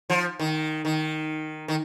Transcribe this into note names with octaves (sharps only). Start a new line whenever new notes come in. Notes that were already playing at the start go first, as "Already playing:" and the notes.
F3
D#3
D#3
D#3